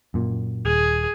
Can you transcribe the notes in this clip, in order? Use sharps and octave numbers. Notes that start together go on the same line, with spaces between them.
F#2 A#2
D#1 G#4